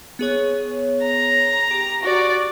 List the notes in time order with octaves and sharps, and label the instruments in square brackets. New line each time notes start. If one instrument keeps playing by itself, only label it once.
[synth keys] B3 G#4 C#5
[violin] A#5
[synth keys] G4
[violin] F#4 D5